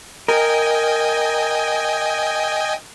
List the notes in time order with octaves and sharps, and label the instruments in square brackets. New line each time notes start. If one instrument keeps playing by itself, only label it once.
[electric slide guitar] A#4 [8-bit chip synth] D#5 G5 G#5